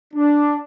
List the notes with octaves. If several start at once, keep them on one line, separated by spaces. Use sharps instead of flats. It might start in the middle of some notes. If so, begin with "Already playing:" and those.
D4